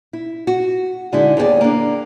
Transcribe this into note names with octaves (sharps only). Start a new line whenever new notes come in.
E4
F#4
D3 G#3 D#4 E4
D#2 B3 G4 G#4 D5
A#3 D4